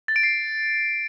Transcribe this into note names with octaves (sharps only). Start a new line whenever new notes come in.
A6
D7
C7